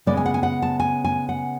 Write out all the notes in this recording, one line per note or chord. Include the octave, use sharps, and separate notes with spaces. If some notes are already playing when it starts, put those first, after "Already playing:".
C#3 G#3 B3 D5
G#5
F#5
G#5
F#5
A5
G#5
G#5
F#5